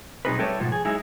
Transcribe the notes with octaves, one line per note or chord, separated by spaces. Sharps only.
B2 F#3 C4 D#4 G#4 B4
G3 A3 G4 A4 B4 C#5
G#2 B2 F3
G#4
F#3 G#3 D#4 E4 G#4